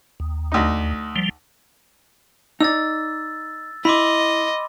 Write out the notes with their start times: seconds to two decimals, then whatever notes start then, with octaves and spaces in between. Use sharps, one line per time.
0.20 D#2
0.52 D2 D#4
1.16 F3 G3
2.60 D#4 D5 E6 A6
3.85 E4 D#5 B5 C6 D6